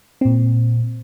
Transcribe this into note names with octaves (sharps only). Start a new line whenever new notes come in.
A#2 C4